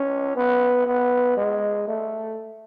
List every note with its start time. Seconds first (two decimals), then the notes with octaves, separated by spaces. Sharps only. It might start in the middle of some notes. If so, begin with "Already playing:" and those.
Already playing: C#4
0.36 B3
0.86 B3
1.37 G#3
1.88 A3